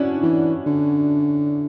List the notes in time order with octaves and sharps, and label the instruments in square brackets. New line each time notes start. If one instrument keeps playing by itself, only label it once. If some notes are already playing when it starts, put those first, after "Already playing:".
Already playing: [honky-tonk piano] C#4 D4 E4 F#4
[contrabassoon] E3
D3